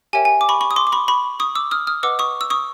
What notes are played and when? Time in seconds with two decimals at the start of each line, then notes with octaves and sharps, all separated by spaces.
0.13 G4 A#4 C#5 E5 G5 G#5
0.25 G#5
0.41 D6
0.49 B5 C#6
0.61 B5 C#6
0.71 D#6
0.76 C6 D6
0.87 D6
0.92 B5 C#6
1.08 B5 C#6
1.40 C#6 D#6
1.55 D6 E6
1.71 D#6 F6
1.87 D#6 F6
2.03 B4 D#5 F#5 D6 E6
2.19 C#6 D#6
2.41 E6
2.50 C#6 D#6